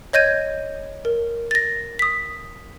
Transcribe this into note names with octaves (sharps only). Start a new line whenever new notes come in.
C#5 D#5 G6 G#6 D#7
A#4
A6 A#6
D#6 B6